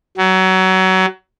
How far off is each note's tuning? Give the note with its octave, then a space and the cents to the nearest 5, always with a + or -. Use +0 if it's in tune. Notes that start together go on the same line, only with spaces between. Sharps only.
F#3 +25